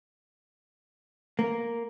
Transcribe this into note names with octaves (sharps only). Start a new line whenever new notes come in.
A#3